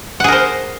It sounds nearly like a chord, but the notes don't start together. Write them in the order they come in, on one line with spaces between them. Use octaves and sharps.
F#5 G#4 A#4 C5